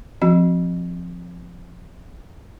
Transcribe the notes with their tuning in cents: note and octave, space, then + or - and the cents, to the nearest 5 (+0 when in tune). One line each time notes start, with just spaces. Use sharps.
F3 +0 C4 +0 F#4 -15